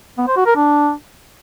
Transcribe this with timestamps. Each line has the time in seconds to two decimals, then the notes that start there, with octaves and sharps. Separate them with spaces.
0.18 B3
0.28 C5
0.37 F#4
0.46 A#4
0.56 D4